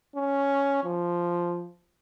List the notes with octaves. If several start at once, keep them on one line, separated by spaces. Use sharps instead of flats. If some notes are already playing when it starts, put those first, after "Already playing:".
C#4
F3